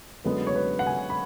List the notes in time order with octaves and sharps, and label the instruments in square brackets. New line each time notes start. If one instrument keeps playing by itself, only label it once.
[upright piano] F#2 D3 G#3 B3 B4
C#5
B4
F#5
G#5
B5